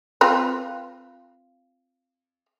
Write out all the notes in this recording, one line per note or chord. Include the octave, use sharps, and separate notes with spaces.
C4 F4 B4